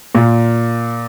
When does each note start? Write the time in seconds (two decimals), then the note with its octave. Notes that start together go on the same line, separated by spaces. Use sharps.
0.15 A#2